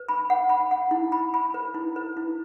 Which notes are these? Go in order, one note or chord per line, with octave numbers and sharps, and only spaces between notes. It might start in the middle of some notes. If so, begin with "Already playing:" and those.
Already playing: B4
B5
F#5
B5
F#5
E4
B5
B5
B4
E4
B4
E4